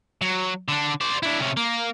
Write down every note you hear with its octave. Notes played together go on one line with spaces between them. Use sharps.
F#3
D3 D4
C5 D5
D4 E4
C3 C#4
A#3